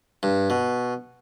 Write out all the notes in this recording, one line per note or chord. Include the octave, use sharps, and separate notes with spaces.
G2
B2